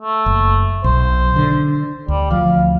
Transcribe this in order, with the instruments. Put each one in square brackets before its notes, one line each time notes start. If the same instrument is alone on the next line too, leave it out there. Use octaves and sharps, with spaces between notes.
[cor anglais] A3
[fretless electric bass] F#1
[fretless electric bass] B1 [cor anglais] C5
[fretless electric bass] D3
[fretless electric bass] D2 [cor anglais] G3
[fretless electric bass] D2 F3 [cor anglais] F5